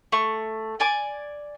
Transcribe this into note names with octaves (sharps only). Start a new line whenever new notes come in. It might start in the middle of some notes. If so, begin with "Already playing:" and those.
A3 C#6
D5 G#5 D6